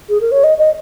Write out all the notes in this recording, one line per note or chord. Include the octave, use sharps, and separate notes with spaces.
G#4
A#4
C#5
D#5
D#5